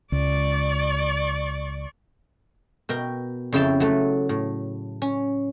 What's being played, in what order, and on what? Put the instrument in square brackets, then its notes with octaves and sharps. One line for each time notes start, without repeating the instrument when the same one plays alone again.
[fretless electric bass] C#2 [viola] D5 C#6
[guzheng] B2 A#4 G5
F2 C#3 E4 G5 A5
F#3 A3
A2
C#4